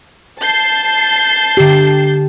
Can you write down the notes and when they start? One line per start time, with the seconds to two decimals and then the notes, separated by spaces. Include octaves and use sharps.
0.41 A5 G6 C7
1.57 D3 G4